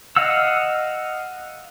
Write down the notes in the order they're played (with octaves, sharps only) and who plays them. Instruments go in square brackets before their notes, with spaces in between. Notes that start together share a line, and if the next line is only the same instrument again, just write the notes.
[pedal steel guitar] D#5 F5 F#5 E6